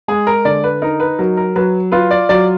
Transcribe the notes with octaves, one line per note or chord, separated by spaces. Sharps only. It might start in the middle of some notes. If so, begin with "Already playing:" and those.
G#3 G#4
A#4
D3 D5
B4
D#4 A#4
B4
F#3 A#4
A#4
F#3 B4
F4 B4
D5
F#3 D5